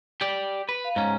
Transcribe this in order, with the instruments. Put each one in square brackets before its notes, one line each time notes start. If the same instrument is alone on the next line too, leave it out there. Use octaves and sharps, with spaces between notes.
[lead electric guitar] G4 D5
B4
[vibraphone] F5
[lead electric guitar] G#2 C#4 [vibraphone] A#5